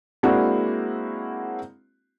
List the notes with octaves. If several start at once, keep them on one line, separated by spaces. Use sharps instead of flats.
G#3 A#3 C4 D4 E4 F#4